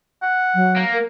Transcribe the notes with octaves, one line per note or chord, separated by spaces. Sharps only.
F#5
F#3
A#3
A#4